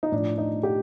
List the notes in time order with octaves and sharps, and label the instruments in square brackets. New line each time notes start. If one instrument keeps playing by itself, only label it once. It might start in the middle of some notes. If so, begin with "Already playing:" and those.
[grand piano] D#4
A2 F3 D4
D#4
G4